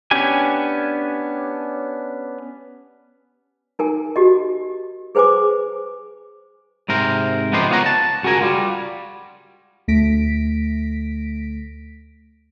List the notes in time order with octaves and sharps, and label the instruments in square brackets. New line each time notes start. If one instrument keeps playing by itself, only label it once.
[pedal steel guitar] B3 C#4 D4 G4 G#5
[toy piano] D#4 A#4 G#5
F#4 G4 D#5
G#4 B4 C5 G#5 D6
[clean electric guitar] G#2 C3 A#4 C5
C#2 F3 B3 D#4 G4 C6
B3 F4 C#5 F#5 A#5
A5
C#2 F#4 G#4 A#4 G#5
G3 F4 F#4
[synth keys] D2 A3 A#6 B6 D7